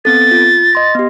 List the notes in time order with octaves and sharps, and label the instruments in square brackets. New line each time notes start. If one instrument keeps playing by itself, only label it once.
[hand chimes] B3 C4 A4 [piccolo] A6
[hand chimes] F4
D#5 C6 A#6
B3 G4